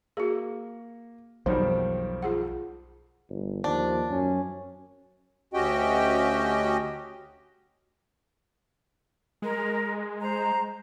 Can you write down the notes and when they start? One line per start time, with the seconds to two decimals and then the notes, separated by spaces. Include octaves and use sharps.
0.17 A#3 F#4 G#4
1.46 B1 F2 D#3 F#3 G3 C5
2.22 F4 G#4 F#5
3.29 G1
3.64 D#2 F3 D4
4.10 F#2 C#4
5.54 D2 C#4 F#4 G4 D#5 G5
9.42 G#3 A#4
10.20 C5 A#5